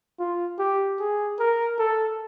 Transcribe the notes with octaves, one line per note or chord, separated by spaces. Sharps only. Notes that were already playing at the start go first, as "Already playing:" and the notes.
F4
G4
G#4
A#4
A4